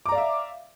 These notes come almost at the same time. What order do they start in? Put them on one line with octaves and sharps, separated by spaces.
D6 A#5 D5 F5 E5